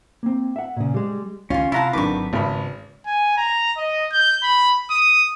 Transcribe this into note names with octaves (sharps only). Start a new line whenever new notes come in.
A#3 C4
E5 F#5
A#2 C#3
G3 G#3
C#2 D#3 C#4 F4 C#5
C3 E4 F4 F#5 A5 A#5
G#1 D3 D#3 F#3 C4 B4 C#6 D6
G#1 C#3 B5
G#5
A#5
D#5
G6
B5
D#6